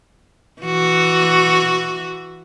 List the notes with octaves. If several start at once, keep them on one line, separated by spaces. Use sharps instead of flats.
E3 F#4